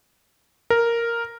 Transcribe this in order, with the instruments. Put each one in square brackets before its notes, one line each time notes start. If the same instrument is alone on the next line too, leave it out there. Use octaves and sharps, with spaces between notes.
[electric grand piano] A#4